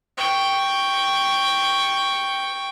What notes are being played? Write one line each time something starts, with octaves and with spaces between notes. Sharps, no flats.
G5 C#6